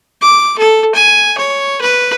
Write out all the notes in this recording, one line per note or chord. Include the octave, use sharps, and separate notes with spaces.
D6
A4
G#5
C#5
B4